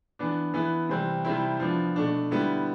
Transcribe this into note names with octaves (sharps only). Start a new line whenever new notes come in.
E3 B3 D4
E3 B3 E4
C3 E3 G3 C4
C3 G3 C4 E4
F3 B3 D4
B2 A3 D4
D3 G3 B3 E4